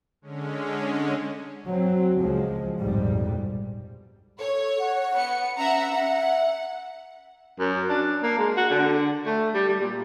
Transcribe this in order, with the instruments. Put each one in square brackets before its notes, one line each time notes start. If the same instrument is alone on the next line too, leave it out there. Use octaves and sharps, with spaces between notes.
[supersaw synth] D3 G#3 C#4
[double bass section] F#3 C4
C#2 F3 G#3
A#1 F2 G#2 B2 G3
[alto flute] A4 [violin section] C#5
[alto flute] F#5
[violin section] B3 C#7
[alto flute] C#4 [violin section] E5 F#5 A#5
[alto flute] E5 [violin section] F#5
[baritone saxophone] F#2
D4
A#3
G#3
F#4
D3
A3
G3
G3
A#2